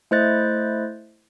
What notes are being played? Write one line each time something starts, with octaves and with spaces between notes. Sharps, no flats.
A3 E4 C5 D#5 F#6 A6